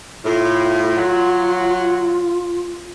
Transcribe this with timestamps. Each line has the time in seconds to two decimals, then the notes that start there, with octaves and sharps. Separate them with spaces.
0.25 A2 F4
0.97 F#3